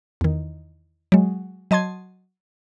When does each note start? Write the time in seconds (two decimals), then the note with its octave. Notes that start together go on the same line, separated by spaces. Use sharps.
0.21 E2 D#3
1.12 F#3 G#3
1.71 F#3 D#5 A5 C6 G#6